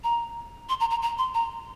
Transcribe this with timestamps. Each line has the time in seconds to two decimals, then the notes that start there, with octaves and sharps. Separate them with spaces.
0.04 A#5
0.69 C6
0.80 A#5
0.91 A#5
1.02 A#5
1.18 C6
1.34 A#5